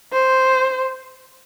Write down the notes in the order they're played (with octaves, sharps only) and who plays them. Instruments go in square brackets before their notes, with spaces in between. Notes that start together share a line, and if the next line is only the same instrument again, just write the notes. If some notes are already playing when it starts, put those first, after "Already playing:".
[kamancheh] C5